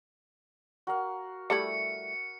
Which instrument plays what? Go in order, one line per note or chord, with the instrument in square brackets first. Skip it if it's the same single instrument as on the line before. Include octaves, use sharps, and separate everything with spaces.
[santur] F#4 A#4 F5
[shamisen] G3 A3 E4 [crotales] C#7